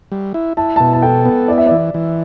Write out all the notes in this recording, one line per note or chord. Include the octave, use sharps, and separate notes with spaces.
G3
E4
E4 A5
A5
B2
A5
A4 G5
B3
E4 D5
E5
E3 D5
E3